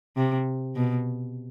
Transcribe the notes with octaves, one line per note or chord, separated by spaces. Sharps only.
C3
B2